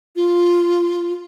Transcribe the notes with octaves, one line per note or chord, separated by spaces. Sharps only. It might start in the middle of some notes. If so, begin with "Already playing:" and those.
F4